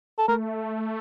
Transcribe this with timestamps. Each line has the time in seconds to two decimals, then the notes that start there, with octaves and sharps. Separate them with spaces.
0.18 A4
0.28 A3 A#4